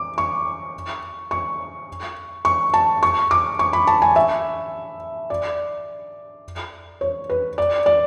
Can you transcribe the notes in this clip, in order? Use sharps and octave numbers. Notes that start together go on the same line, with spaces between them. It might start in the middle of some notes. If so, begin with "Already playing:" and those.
Already playing: D6
C#6
C#6
C#6
A5
C#6
D6
C#6
B5
A5
G#5
E5
D5
C#5
B4
D5
D5